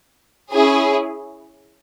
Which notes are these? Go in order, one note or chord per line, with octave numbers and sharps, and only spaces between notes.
C#4 E4 G#4